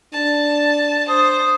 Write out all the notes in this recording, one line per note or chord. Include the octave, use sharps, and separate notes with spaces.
D4 A5
C5 D#6